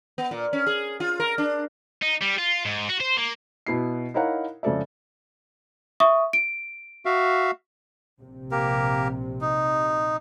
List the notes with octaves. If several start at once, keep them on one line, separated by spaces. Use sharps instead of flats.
B3
A#2
C#4
G#4
F4
A#4
D4
D#4
G3
F4
G#2
F#4
C5
A#3
B2 B3 E4 C7
D#4 E4 A#4 C#5 F5 F#5
F2 C#3 G#3 A4 D5 E5
E5 C#6 D#6
D7
F#4 E5 F5
A#1 C3
A#3 G4 A#4
D#4